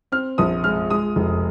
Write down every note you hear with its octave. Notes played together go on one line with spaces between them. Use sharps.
C4 F6
A#1 D#6
G#3 F6
G#3 D#6
F1